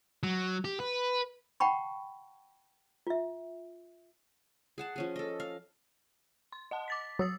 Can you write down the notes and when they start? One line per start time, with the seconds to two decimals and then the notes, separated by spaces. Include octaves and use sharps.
0.23 F#3
0.65 G4
0.80 B4
1.60 F#5 G5 A5 B5 C#6
3.07 F4 E5
4.78 G#4 F#5 A5
4.96 F3 C#4 G#4
5.16 A4 D#5
5.40 F5
6.52 C6
6.71 D#5 F#5 A5
6.88 D6 A6 B6
7.19 F#3 D#6 E6 A6